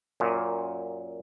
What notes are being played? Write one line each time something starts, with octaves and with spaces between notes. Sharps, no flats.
F#2 A#2